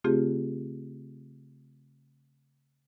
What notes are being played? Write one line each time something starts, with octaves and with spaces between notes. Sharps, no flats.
C#3 A3 C4 F4 G4 G#4